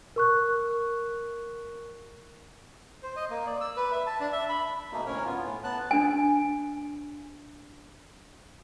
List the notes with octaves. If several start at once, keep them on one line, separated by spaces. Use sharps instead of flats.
A#4 C#6 F#6
C5
D#5
A#3
D5
E6
B4
E5
A5
D4
E5
B5
B2 A3 A#3 D#4
D2 A2 C#4 A#4 C#5
B3 F4
A2
B3 A5 F#6
D4 G#5